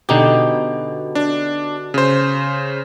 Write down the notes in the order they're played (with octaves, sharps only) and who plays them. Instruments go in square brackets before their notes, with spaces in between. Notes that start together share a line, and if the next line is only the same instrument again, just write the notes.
[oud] B2 [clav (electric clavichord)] D3 D#4 G4
[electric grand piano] D4
C#3 C5